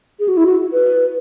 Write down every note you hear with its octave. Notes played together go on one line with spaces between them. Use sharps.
G#4
F#4
E4
F#4
B4